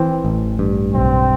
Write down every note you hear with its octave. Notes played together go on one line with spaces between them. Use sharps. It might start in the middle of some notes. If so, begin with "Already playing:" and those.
Already playing: E3 C4
A1
G2
B1 C4